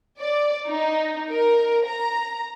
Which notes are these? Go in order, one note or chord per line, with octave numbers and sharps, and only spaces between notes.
D5
D#4
A#4
A#5